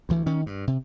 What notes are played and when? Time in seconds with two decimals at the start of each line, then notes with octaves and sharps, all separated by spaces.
0.09 D2 E3
0.26 D#3 C#4
0.46 G2
0.67 C3